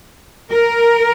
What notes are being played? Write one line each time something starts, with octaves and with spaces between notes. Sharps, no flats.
A#4